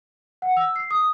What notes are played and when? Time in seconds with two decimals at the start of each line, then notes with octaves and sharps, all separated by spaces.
0.42 F#5
0.57 E6
0.76 C7
0.91 D#6